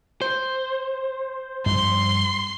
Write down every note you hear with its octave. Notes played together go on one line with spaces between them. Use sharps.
C5
G2 F3 C6